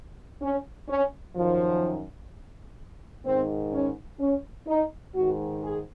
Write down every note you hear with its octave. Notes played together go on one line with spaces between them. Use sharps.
C#4
C#4
F#2 D#3 F3
G#2 D#3 C4
C#4
C#4
D#4
G#2 D#3 F#4
G#4